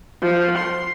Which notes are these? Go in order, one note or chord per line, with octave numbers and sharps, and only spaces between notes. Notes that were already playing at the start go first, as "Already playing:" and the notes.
F3
C6